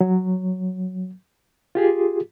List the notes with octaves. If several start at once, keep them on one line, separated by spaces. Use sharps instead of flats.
F#3
F4 G4 G#4